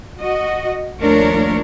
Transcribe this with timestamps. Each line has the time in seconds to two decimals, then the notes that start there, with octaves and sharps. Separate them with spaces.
0.19 F#4 D#5
0.99 D#2 F3 A3 D4 A#4 C#5